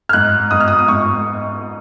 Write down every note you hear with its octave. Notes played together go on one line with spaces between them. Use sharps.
F6
G#2 F#6
G#2 D#6
F6
D#6
D#6
G#2 C#6